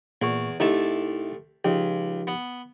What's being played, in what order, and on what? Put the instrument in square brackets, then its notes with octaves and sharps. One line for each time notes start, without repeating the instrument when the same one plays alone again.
[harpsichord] E2 [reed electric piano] A#2 C#6
[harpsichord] C2 A3 A5 [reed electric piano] D#4 E4
[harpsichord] C#2 [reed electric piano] F3 D#4 G4
[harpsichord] B3